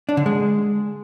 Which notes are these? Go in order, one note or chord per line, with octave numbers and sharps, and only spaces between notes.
D4
D3
G#3